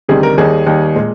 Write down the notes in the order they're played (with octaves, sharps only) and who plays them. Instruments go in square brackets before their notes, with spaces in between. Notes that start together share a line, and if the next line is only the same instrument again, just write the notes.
[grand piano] D2 C3 D#3 G3 G#4
A#4
D#2 D#3 G3 G#4
D#2 D#3 G3
A#2 G#3